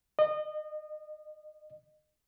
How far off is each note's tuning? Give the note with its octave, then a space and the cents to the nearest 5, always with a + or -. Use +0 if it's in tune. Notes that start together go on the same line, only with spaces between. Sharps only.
D#5 -30